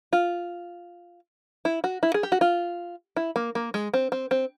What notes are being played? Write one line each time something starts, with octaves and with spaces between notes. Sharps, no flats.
F4
E4
F#4
E4
G#4
G4
F#4
F4
E4
A#3
A#3
G#3
C4
C4
C4